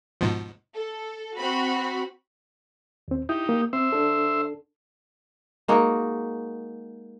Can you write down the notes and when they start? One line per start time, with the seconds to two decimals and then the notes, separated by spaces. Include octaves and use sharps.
0.21 G#2 B2 F3
0.75 A4
1.38 C4 F#4 B5
3.08 D#2 C4
3.29 D#4 E4 G4
3.49 A#3
3.73 C4 C5 E5
3.92 D4 A4
5.68 G#3 A#3 D#4 F#4